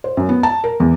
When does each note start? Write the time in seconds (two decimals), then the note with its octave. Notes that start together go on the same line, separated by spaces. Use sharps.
0.04 C5
0.17 F#2
0.29 B3
0.43 A5
0.64 A#4
0.80 E2